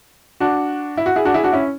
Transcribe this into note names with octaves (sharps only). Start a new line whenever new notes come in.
D4 F#4
E4
F#4
E4 G#4
D4 F#4
E4 G#4
D4 F#4
C#4 E4